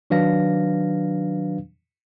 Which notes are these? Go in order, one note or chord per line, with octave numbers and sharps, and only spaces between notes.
D#3 F#3 D4 B4 F5 A#6